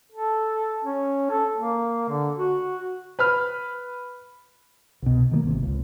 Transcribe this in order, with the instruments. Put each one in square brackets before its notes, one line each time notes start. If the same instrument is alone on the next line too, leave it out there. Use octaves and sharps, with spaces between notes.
[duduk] A4
C#4
A4
A#3
D3
F#4
[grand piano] B4 B5 F6
[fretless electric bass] C2 B2
D#3 E3 A#3
G#1 C3
C#2